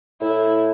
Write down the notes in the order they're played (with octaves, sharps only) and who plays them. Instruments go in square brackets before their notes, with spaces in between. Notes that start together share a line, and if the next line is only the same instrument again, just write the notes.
[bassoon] A2 [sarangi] E4